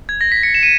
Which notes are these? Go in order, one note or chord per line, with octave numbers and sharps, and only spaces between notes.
G#6
A#6
B6
C#7
E7
D#7